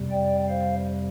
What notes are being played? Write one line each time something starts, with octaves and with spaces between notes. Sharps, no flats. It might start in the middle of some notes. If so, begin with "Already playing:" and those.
Already playing: F2 C3 G3
D5 G5
C5 F5